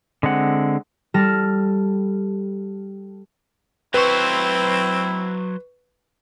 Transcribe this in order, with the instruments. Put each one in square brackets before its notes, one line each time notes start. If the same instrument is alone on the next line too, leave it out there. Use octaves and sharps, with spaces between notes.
[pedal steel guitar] D3 G#3 C4 F#5
[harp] G3 A4 F6 A#6 E7
[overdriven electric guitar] F#3 C5 [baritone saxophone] C4 [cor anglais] E4 [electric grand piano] B4 C#6